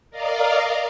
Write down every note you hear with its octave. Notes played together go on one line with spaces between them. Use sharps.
A#4 D5 D#5 F5